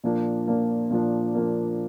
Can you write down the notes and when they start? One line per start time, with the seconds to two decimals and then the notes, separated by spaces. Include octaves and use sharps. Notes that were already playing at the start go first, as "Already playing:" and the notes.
0.04 A#2 F3 A#3 D4
0.47 A#2 F3 A#3 D4
0.90 A#2 F3 A#3 D4
1.34 A#2 F3 A#3 D4